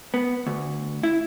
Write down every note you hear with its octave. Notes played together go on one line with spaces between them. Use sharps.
B3
D2
E4